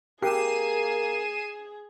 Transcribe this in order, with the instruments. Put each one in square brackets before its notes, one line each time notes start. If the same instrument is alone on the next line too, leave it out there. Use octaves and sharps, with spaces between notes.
[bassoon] A#3 [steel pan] G4 [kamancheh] G#4 [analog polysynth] C7 D#7 E7